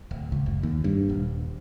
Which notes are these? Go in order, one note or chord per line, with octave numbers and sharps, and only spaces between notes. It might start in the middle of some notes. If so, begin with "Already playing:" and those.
D1
C#2
F#1
D#2
G2
D#1